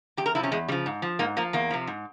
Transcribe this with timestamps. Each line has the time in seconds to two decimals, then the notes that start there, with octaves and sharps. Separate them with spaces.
0.17 E2 G4
0.26 A#4
0.35 C3 F3 E4
0.43 C#4
0.52 E2 G#3
0.68 C#3 F3 G3
0.86 G#2
1.02 F3
1.19 G#2 A#3
1.37 F3 A#3
1.53 E2 A#3
1.70 C3 F3
1.87 G#2